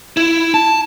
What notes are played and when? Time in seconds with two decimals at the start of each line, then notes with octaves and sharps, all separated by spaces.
0.17 E4
0.54 A5